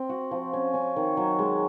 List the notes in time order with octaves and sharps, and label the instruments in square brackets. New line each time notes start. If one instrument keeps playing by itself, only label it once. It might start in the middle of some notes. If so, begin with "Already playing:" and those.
Already playing: [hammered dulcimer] C4
F#4
F3
C#4
C#4
D#3
F#3
G#3